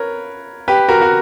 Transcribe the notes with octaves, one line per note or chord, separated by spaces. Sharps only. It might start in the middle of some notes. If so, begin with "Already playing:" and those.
Already playing: A#4 B4 C#5
G4 B4
F#4 A#4
F#4